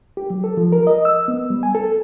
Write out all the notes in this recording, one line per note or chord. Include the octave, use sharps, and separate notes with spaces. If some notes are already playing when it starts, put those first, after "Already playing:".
G4
F#3
A4
F3
A#4
D#5
E6
B3
G3
G#5
A4